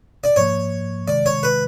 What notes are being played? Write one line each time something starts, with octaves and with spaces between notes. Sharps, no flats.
D5
G#2 F3 A#3 C#5
C3 D#3 G#3 D5
C#5
B4